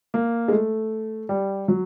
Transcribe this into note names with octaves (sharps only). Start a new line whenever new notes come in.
A#3
G#3
A3
G3
F#3